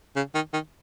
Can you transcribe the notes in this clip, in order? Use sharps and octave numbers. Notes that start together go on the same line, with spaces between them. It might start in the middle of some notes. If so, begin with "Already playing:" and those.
C#3
D#3
D#3